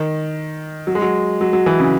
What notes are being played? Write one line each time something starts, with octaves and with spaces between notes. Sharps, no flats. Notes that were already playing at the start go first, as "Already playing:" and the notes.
Already playing: D#3
F#3
G#3
F#3
F#3
F#3
E3
C#3